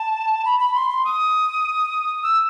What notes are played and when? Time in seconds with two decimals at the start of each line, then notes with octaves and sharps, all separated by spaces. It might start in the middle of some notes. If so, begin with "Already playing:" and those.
Already playing: A5
0.45 B5
0.59 B5
0.74 C6
0.89 C6
1.05 D#6
2.22 E6